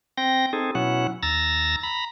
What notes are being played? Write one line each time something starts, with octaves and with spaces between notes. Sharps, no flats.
C4 G5 A#6
C4 D#4 G#4 A4
B2 F#3 C#4 E4 F#5
D#2 A#5 E6 A6 A#6
A#5 B5